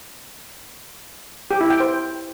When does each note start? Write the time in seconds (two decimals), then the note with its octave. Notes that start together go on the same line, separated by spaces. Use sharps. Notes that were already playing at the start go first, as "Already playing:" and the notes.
1.51 G4
1.60 E4
1.70 G5
1.80 C5